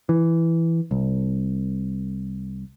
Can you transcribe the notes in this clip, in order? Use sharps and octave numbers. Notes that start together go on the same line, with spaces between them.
E3
C2